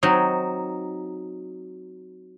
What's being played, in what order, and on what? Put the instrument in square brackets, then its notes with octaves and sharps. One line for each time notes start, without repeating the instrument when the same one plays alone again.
[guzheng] F#3 C4 D#4